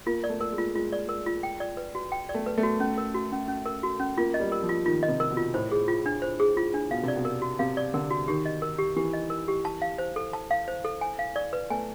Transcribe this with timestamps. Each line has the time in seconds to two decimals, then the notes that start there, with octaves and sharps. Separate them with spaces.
0.06 A#3 F4
0.24 D5
0.29 A3
0.41 A#4
0.52 G#3
0.58 F4
0.75 G#3 F4
0.93 D5
1.09 A#4
1.26 F4
1.43 G5
1.60 D5
1.77 B4
1.95 F#4
2.12 G5
2.29 D5
2.34 A3
2.46 B4
2.58 A3
2.63 F#4
2.80 C#4
2.98 A#4
3.15 F#4
3.32 C#4
3.48 C#4
3.66 A#4
3.83 F#4
4.00 C#4
4.18 A#3 F4
4.34 D#5
4.40 G3
4.52 A#4
4.63 F3
4.69 F4
4.86 D#3 F4
5.03 D#5
5.08 C3
5.20 A#4
5.31 B2
5.37 F4
5.54 A2 C5
5.72 G#4
5.88 F4
6.06 D4
6.22 C5
6.40 G#4
6.57 F4
6.74 D4
6.91 B2 F5
7.03 C3 D5
7.16 B2
7.25 A#4
7.42 F#4
7.59 C3 F5
7.77 D5
7.94 D3 A#4
8.11 F#4
8.28 D#3 G4
8.46 D#5
8.62 A#4
8.79 G4
8.96 E3 G4
9.13 D#5
9.30 A#4
9.48 G4
9.65 A5
9.82 F5
9.98 C5
10.16 A4
10.33 A5
10.51 F5
10.68 C5
10.85 A4
11.01 G#5
11.19 F5
11.36 D5
11.53 B4
11.70 A3 G#5